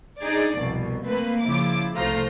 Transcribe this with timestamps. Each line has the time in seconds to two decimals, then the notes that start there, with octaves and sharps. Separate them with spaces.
0.22 D4 D#4 G#4 D5
0.57 C2 F2 B2
1.06 A3 A#3 C4 B4
1.42 C#3 F3 E4 D6
1.95 C2 A3 F4 C5 A#5